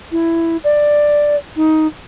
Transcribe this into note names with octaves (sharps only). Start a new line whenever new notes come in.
E4
D5
D#4